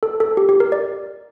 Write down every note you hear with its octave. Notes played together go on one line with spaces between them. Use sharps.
A4
A4
G4
G4
A#4
D5